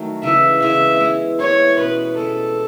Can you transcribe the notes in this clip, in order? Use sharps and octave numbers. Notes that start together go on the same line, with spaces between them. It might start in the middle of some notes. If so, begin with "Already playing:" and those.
Already playing: D#3 F#3 A3
C#3 E3 G#3 E5
C#3 E3 G#3 E5
G#3 B3 E4
G#3 B3 E4 C#5
B2 G#3 C#4 B4
B2 G#3 C#4 A4